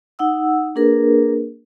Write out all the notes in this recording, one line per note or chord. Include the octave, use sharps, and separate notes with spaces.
D#4 F#5 E6
A#3 D4 G#4 A#4 B4